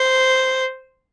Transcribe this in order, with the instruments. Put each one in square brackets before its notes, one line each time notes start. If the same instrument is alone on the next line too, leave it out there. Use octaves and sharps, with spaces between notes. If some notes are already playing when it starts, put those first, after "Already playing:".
Already playing: [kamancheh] C5